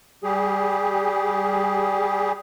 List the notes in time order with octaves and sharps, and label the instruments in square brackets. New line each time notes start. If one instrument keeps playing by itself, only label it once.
[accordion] G3 G4 G#4